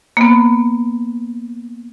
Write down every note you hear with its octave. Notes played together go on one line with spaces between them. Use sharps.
A#3 B3